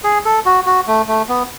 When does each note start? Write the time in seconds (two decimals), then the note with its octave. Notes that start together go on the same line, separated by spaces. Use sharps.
0.04 G#4
0.25 A4
0.46 F#4
0.66 F#4
0.87 A3
1.08 A3
1.29 B3